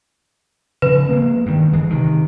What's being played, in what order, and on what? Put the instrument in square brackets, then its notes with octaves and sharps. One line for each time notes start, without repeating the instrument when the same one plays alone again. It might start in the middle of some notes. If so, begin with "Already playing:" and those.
[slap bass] C#3 F3 [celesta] B4
[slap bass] G#3 A#3 B3
G2 D#3
G1 E3 G#3
C3 D#3